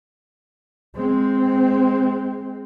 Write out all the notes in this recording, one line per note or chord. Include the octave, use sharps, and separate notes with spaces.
G#3 C4